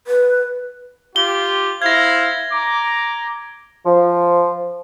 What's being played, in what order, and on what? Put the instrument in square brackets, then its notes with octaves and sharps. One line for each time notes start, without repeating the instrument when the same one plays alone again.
[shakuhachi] B4
[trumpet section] F4 G4 [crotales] G7
[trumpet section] E4 C5 F5 [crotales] G#6 A#6
[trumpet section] A#5 D6
[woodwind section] F3